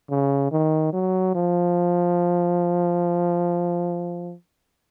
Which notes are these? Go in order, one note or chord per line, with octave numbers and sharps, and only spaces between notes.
C#3
D#3
F#3
F3